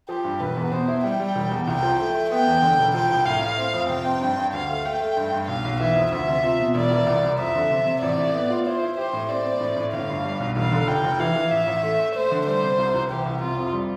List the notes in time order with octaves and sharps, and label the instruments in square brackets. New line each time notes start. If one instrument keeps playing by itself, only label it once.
[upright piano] F3 [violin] G4
[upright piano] G2
[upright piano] E1 [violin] B4
[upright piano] E2
[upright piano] B2 [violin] C5
[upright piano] E4
[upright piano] G3 [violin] G5
[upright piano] G3
E1
E2
[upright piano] C2 [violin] G5
[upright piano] F3
A3
A3
[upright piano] B3 [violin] G5
[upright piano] E2
D3
E1
[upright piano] F3 [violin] G5
[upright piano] C2
[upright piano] A2 [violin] F5
[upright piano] A2
C4
F2
[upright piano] C3 [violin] G5
[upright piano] C4
G2
G2
[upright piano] D2 [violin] F5
[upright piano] A3
[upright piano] A3 [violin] G5
[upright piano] A3
G2
G2
[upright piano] B1 [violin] F5
[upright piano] B1
[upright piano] E3 [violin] E5
[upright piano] F2
[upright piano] D2 [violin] E5
[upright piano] C3
F4
B2
[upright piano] E1 [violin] D5
[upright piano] E3
C2
C2
[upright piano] F2 [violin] E5
[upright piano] D3
C3
C3
[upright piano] A1 [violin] D5
[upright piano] A2
B3
F4
[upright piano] E4 [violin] C5
[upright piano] E4
[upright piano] G4 [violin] C5
[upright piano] A2
[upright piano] C4 [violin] D5
[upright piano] C4
A2
A2
[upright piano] G1 [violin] F5
[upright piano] G2
G3
B1
[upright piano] E1 [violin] F5
[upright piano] D3
[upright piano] F1 [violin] G5
[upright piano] F1
[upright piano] E3 [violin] F5
[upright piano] E3
[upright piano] A1 [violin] E5
[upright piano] A1
A3
A3
[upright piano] A3 [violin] C5
[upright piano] D3
[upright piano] G3 [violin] C5
[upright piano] C3
C2
C2
[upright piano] E3 [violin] G4
[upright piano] C2
[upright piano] C3 [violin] F4
[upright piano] F2
G3